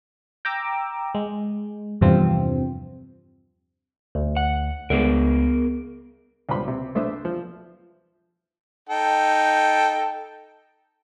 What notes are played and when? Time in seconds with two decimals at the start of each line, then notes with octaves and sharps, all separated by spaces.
0.45 G5 A#5 D6 E6
1.15 G#3
2.01 E2 G2 C3 F3 C4
4.15 D2
4.37 F#5
4.90 C#2 B3 G#4 A#4
6.49 C#2 G2 C5 B5 C6
6.68 C3
6.95 B1 A3 D4 C5 E5 D#6
7.25 F3
8.89 D#4 A4 G5